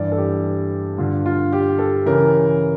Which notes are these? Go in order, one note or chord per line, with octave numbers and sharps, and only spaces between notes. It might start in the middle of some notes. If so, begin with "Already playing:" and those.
Already playing: G2 E3 D5
A4
G4
G2 D3 F4
F4
G4
A4
C#3 E3 A#4